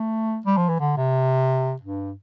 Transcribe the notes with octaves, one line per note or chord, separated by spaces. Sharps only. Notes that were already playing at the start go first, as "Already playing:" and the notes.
Already playing: A3
G3
F3
E3
D3
C3
G2